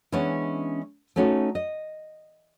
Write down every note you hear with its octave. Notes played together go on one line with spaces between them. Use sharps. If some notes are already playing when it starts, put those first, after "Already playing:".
E3 G#3 B3 C#4 D4
A3 B3 C#4 D#4 F#4 A4
D#5